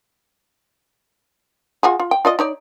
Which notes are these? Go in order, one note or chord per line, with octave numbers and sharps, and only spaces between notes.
F4 F#4 G#4
F4
G5
F4 D5 D#5
D#4 C#5 D5